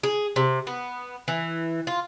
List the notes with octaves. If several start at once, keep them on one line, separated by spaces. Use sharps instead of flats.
G#4
C3
B3
E3
F4